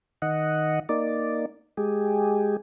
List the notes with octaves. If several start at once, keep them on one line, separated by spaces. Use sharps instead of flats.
D#3 D#5 F#5
A#3 D#4 D5
G#3 G4 G#4